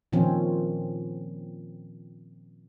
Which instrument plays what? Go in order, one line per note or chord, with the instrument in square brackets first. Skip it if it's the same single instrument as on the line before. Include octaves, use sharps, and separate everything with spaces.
[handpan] A#2 D#3 F3 C4 C#4